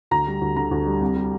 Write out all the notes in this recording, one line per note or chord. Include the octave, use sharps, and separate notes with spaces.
D2 A#5
G3
D2
D3 A#5
D2
G3
C2
G3